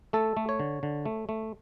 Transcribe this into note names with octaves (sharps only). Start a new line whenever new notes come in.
A3 A4
A3
C#5
D3
D3
A3
A3